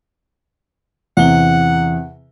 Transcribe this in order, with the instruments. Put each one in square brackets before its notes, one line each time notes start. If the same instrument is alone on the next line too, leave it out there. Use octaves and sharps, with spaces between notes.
[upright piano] E2 C3 G7 [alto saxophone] F#5